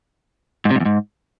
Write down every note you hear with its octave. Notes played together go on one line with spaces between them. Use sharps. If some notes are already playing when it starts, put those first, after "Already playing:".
G#2
C3
G#2
E2
G#2